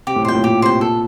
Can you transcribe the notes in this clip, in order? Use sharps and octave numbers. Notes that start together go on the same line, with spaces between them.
C3 G4
A2
A#2 C5 G5
A2
A#2 G4
C3 C5 G5
A#2 A4